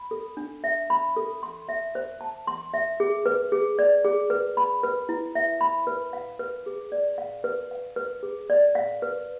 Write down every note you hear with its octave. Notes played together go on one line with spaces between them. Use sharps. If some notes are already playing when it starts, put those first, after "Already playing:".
Already playing: B5
A4
D4
E5
B5
A4
C6
E5
C5
A5
C6
E5
G#4
B4
G#4
D5
G#4
B4
B5
B4
E4
E5
B5
B4
F5
B4
G#4
D5
F5
B4
F5
B4
G#4
D5
F5
B4